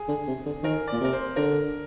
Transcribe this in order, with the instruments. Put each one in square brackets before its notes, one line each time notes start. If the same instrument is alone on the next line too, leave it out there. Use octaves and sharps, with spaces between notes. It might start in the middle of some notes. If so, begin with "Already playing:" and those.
Already playing: [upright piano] G#4
[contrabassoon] D3
C3
D3
[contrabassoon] D#3 [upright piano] A#4
[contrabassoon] A#2 [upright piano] D5
[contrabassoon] C3 [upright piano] A#4
[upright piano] C5
[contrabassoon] D3 [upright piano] A#4